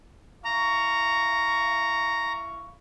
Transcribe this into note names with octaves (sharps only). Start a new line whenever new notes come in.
E4 F5 A#5 C#6